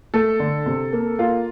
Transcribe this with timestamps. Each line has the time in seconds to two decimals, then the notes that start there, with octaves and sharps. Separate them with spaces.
0.14 A3 A4
0.40 D3
0.66 C3
0.93 A#3
1.19 A#3 F4